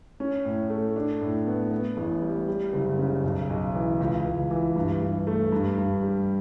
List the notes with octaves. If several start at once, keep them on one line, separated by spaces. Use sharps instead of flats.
C#4
A2
A3
D4
A2
B3
B3
A1
G3
G3
F#1
C#3
B1
B1
E3
C#2
C#2
E3
G2
G2
A3
G2
G2
G3